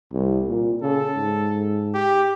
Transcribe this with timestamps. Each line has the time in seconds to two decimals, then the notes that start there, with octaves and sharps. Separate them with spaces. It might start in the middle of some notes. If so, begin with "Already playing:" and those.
0.13 C2
0.48 A#2
0.82 C#3 A4
1.17 G#2
1.94 G4